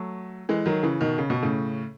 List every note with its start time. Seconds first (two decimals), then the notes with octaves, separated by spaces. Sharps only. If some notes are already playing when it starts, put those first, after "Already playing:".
Already playing: F#3 A3
0.49 E3 G#3
0.66 D#3 F#3
0.83 C#3 E3
1.01 B2 D#3
1.18 C#3
1.30 B2
1.43 A2 C#3